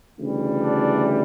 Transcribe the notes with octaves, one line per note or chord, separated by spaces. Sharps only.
D2 C#3 E3 G3
D4